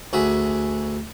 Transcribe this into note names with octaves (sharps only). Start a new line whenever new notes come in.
D2 F#4 G#4 E5 G#5